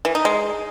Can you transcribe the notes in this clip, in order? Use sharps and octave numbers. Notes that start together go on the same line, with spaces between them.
E3
D#4
G#3